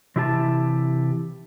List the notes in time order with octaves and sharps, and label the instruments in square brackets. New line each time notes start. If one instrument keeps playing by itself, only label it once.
[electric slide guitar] C3 E3 E4 G4 A#4 A5